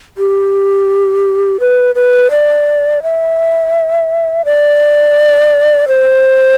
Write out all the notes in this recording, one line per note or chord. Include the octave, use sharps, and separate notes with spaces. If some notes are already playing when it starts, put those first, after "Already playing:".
G4
B4
B4
D5
E5
D5
C5